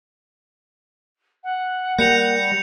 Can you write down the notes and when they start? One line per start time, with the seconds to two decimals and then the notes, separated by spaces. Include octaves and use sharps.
1.44 F#5
1.99 G3 A#3 G6 A#6 C#7 F7